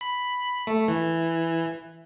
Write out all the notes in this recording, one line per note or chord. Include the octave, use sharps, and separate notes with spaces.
B5
A3
E3